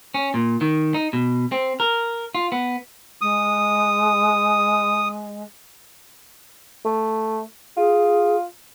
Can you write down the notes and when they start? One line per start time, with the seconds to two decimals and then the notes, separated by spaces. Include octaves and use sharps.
0.14 C#4
0.34 A#2
0.61 D#3
0.94 D#4
1.13 B2
1.52 C4
1.80 A#4
2.35 F4
2.52 B3
3.21 G#3 D#6
6.85 A3
7.77 F4 G#4